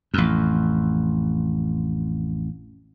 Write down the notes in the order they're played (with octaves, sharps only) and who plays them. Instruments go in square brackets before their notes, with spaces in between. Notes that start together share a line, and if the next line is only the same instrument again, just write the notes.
[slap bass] A1 F2